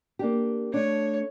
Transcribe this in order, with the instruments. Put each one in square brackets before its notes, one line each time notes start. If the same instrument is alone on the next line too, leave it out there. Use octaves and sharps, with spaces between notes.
[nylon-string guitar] A#3 D4 G4
[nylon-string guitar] A3 D4 [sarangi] C#5